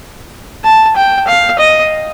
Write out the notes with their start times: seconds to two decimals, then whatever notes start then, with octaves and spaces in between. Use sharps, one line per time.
0.64 A5
0.96 G5
1.28 F5
1.59 D#5